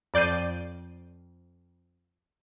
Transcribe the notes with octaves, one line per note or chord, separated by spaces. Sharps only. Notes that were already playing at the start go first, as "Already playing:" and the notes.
F2 D5 G6 C7 D#7